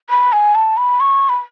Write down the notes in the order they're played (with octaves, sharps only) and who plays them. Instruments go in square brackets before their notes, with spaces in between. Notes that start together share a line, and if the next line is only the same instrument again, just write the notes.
[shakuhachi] B5
G#5
A5
B5
C#6
B5